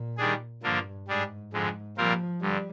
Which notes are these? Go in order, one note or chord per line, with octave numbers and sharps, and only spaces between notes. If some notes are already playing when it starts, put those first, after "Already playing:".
Already playing: A#2
D#3 G3 D4 G#4
G2 D3 F3 A#3 D4
G#2 G3 D4 G#4
F2 G#2 D3 G#3
A#2 F3 G3 C4 F4 A#4
G2 D3 G3